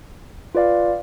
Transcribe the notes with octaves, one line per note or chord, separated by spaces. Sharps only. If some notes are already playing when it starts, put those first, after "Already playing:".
F4 B4 D5 F5